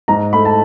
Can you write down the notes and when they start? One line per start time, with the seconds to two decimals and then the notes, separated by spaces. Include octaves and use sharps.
0.08 G#2 A#5
0.33 A3 B5
0.45 A5